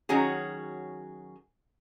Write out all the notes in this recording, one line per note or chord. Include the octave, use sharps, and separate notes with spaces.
D#3 F#3 C#4 F#4 G#4